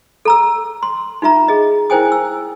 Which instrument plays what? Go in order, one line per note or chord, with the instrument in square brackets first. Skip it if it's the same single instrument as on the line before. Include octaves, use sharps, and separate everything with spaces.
[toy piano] A4 A#5 E6
C6
D#4 F4 E5 A#5
G#4 D#5
E4 A#4 C5 G5 G#5 D#6
E6